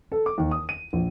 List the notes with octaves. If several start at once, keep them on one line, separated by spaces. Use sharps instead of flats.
A4
D6
D#2
D#6
D#7
A#1